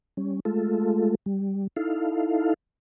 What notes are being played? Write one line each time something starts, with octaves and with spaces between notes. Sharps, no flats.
G3 C#4
G#3 A3 F4 A4
G3
D#4 E4 A4 F5